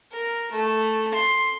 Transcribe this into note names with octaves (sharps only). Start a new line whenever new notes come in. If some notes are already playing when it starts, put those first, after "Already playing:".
A#4
A3
C6